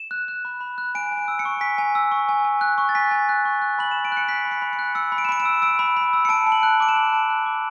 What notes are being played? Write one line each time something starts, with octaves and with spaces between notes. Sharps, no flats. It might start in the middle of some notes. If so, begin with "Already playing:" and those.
Already playing: E7
F#6
F#6
B5
B5
F#6
G#5 D7
G#5
D7
E6
C#7
C#6
G#5 B6
G#5
E6
C#6
G#5
G#5
F#6
C#6
A6
G#5 B6
G#5
F#6
C#6
F#6
B5 F#7
B5 E7
D7
F#6 C#7
F#6 B6
B5
C#7
B5
C#7
F#6
E6 C#7
B5
D7
E7
B5 D7
E7
E6
E6 D7
B5
B5
E6
C#7
A5 D7
A5
F#7
F#6
D6 D7
E7
A5 F#7
A5
F#6
D6